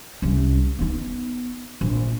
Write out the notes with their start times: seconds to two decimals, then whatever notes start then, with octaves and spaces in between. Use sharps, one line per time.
0.22 C2 C#4
0.79 B3 D#4
1.81 A#1